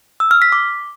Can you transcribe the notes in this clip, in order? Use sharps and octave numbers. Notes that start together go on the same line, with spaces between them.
E6
F6
B6
D6